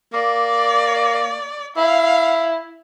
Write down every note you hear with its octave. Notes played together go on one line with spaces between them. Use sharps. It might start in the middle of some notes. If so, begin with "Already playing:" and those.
A#3 D5
E4 F5